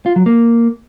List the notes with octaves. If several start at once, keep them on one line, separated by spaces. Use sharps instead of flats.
F4
F#3
A#3